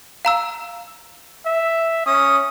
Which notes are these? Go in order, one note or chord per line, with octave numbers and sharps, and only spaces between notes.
F5 A#5 E6
E5
C#4 D#6